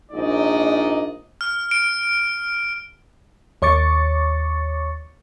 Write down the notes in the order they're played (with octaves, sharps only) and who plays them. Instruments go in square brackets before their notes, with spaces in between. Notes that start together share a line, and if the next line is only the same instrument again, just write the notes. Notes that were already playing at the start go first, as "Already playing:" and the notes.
[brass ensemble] A#1 G#2 D#4 D5 D#5
[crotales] F6
D7
[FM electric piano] D#2 C#5 C#6 D6 A6 C#7